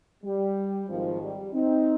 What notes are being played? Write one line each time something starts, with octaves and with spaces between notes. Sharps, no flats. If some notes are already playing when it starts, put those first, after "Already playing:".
G3
G#1 G#2 D#3 F3
G3
C4 D#4